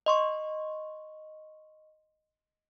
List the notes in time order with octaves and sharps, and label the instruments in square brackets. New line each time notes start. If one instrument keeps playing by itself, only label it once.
[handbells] D#5 C6 C#6